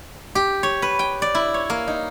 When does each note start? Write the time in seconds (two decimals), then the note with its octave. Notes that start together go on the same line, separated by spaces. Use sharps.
0.35 G4
0.63 C#5
0.82 B4
0.99 G5
1.22 D5
1.35 E4
1.54 C#5
1.70 A#3
1.88 D#4